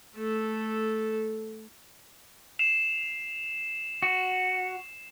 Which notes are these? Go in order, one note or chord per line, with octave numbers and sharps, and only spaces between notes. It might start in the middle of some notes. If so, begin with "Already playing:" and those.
A3 A4
C7 E7 F7
F#4